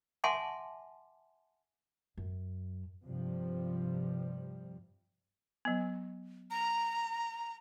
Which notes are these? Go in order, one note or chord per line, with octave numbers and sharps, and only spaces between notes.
E5 F#5 G#5 A5 C6 D6
F#2
G2 C3 F3 G3
F#3 B3
A#5